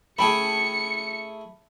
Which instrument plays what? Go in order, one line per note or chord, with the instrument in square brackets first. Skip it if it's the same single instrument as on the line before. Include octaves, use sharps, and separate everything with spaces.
[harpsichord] A3 E4 G#4 [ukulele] C#4 G5 A5 [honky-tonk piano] B5 [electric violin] C#7